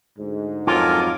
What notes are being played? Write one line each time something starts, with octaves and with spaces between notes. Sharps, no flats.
D2 G#2
F2 F#3 F4 A4 A#4 G#5 D6